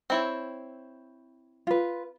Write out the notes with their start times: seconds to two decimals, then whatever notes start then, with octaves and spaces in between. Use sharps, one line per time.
0.10 C4 E4 C#5
1.67 F4 B4